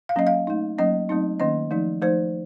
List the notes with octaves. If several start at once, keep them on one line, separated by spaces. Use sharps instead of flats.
F5
F#3 A#3 C#4 D#5
F5
A3 D#4
F#3 A#3 C#4 D#5
F#3 A3 C4 D#4
D#3 A#3 C#4 D#5
F3 A3 D#4
F3 A3 D#4 C5